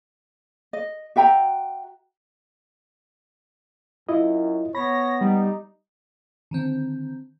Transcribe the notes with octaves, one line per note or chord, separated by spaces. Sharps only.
D#5
F#4 E5 G5 A#5
F#2 E4 F4 D#5
B3 C#5 B5 A#6
G3 D#4
D3 D#3 C4